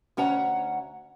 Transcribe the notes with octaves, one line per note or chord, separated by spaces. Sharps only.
D2 C#4 C#5 F#5 A#5